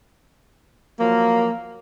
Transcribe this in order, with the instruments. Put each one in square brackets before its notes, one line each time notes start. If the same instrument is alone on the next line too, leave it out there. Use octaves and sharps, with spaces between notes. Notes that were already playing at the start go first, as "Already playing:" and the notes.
[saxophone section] F3 F#3 A#3